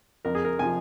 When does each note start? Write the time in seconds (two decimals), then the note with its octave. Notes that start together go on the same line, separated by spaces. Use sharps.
0.25 F2 A#4
0.35 G#4
0.45 A#4
0.59 C3 F3 G#5